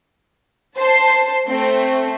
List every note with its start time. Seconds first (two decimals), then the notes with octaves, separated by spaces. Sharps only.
0.76 C5 A5 C7
1.47 A3 C4